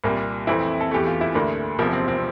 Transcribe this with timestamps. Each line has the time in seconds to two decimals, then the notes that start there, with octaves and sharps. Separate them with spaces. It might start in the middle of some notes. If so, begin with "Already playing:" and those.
0.04 C2 A#2 G3 A#3
0.47 F2 E3 A3 C4 E4
0.81 A4
0.91 E2 E3 A3 G4
1.07 F4
1.21 E4
1.34 D2 D3 A3 A#3 D4
1.79 E1 E2 C3 F3 A#3
1.93 C4
2.08 C4